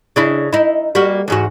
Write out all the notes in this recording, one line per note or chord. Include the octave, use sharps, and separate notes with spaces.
C#3 D4 E4
D#4 E4
G3 A#3 F#4
E2 G#2 F#4